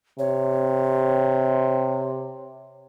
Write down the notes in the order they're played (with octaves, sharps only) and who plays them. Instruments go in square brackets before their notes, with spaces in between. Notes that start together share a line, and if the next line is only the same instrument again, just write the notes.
[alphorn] C3 [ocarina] C#5